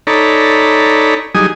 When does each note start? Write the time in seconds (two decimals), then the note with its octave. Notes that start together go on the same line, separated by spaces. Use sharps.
0.07 D#4 A4 C#5 D5 A#5 B5
1.35 F#3 G3 D#4 G#4 G#5 D#6